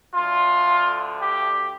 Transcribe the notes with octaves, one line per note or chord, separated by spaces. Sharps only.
D2 D3 F3 F4
G4